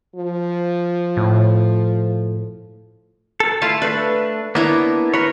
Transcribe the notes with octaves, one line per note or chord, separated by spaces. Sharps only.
F3
A2
A4
A3 E4 F4 F5 A5
A3 D4 B4
A#3 B3 D4 E4 C#5
A#4 B4 C#5